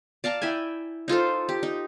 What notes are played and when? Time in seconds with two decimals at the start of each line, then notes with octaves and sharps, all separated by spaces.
0.24 D5 F5 A5 A#5
0.42 E4 E5 G5 G#5
1.08 D#4 F4 A4 C5
1.49 G4
1.63 D#4